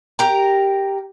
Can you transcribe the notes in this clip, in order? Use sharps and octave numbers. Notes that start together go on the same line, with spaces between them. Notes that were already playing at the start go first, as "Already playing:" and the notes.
G4 A#4 A#5